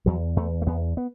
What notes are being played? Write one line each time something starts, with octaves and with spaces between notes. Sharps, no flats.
E2 F#3
E2 A3
A3
E2 B3
B3